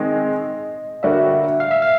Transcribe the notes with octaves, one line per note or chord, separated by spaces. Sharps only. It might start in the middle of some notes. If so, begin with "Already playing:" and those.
Already playing: D#3 G#3 C4 D#5
D3 G3 A#3 D4 F#4 E5
F5
E5
F5